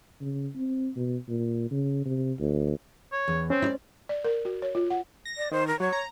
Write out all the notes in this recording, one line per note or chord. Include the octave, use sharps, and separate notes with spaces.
C#3
C4
B2
A#2
C#3
C3
D2
C#5
E2
C4 C#4 C5
E4 D5
D5
A#4
F#4
C#5
F4
F#5
A#6
D5
D#3 C5
A#4
F#3 C#5
A#5